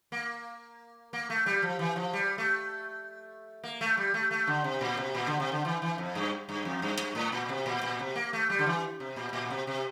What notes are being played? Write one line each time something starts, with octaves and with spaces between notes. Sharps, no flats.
A#3
A#3
A3
G3
F3
E3
F3
G3
A3
A#3
A3
G3
A3
A3
D3
C3
A#2
C3
A#2
D3
C3
D3
E3
E3
F2
G2
G2
F2
G2
G2
A2
A#2
C3
A#2
A#2
C3
A#3
A3
G3
D3
E3
C3
A#2
A#2
C3
C3